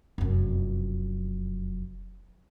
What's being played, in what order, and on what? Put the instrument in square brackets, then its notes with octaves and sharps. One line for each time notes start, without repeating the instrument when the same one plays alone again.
[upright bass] F1 F#2